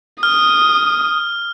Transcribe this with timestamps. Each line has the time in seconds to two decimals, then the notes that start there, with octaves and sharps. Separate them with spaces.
0.23 D#6 F6